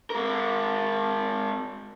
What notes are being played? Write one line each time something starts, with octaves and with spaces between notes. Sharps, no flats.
G#3 A#4